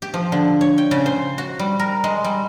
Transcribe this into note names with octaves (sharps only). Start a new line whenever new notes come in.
G4
F3
D3
C#5
G5
C#3
C5
F#4
G3
A#4
G#3
G3